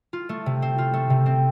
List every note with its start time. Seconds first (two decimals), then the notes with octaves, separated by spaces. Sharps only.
0.13 F4
0.29 A3
0.46 C3
0.62 C4
0.78 F4
0.94 A3
1.10 C3
1.26 C4